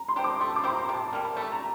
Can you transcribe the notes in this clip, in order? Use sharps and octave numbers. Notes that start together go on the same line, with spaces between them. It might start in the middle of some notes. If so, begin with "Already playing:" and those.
Already playing: A#5
C6
D4 G4 C5
D6
A3 C6
D6
E4 G4 C5 C6
A#5
C3 A5
A5
G3 A#3
A5
A3 A5
A#5